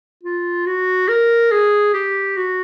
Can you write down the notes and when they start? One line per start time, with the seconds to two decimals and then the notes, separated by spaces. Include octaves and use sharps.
0.23 F4
0.66 F#4
1.09 A#4
1.51 G#4
1.94 G4
2.37 F#4